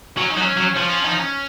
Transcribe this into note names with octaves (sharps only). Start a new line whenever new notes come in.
F#3 C#4
D#4
F#3
C#4
F#3
F3 C#4
C#4
D#4
C#4